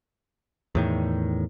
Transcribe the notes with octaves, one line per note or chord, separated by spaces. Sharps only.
E2 A2 D#3